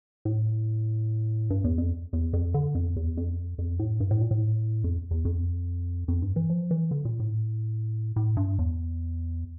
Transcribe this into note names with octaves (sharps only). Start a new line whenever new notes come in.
A2
G2
E2
F2
E2
F2
D3
F2
E2
F2
F2
A2
G2
A2
A#2
A2
F2
E2
F2
F2
G2
E3
F3
E3
D3
A#2
A2
A2
G2
E2